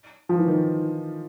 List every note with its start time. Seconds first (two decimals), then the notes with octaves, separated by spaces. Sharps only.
0.29 F3
0.39 E3
0.48 D#3